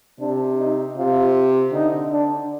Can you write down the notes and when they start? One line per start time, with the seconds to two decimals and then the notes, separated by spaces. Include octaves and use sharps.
0.20 C3 D4
0.59 D#4
0.97 C3 F4
1.72 D3 D#4
2.11 D4